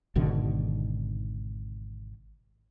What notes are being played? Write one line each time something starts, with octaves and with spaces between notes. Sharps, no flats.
G#1 B2 D3 D#3